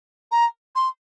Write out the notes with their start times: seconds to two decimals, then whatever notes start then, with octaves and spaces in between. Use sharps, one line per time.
0.31 A#5
0.75 C6